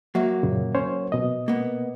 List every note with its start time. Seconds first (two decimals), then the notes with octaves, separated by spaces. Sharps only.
0.15 F#3 A#3 F#4 E5
0.43 F#2 A#2 C#3
0.75 C#4 C5 C#5
1.12 B2 D#5
1.48 A#3 B3